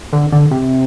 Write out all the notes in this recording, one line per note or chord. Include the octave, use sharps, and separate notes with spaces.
D3
D3
C3